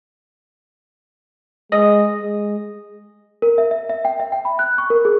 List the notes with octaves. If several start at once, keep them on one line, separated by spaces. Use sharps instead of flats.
G#3 D#5
G#3
A#4
E5
E5
E5
G5
E5
G5
B5
F#6
C#6
A#4
G#4